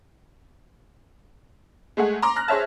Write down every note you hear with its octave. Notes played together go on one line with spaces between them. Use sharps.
G#3 A3 G#4 F#5
A#5 C6 D6
F6 F#6 A#6
G#4 C5 C#5 E5 A5